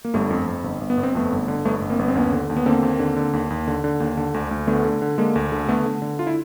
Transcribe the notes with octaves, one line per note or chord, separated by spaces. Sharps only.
A#3
G1 G3 A3
F2
F2
G1
G1
B3
G1
C4
F2 A3 B3
G1
D3
G1 A3 B3
G1
A#3 C4
G1 B3
C4
D#2 B3 C#4
D3
D#2
B3
D3 A#3 C4
D#2
D3
D3
D#2
D#2
D3
D3
D#2
D3
D2
D2
D3 A3 B3
D3
D3
D3 G#3 A#3
D2
D3
D3 A3 B3
D3
D3
F4
E4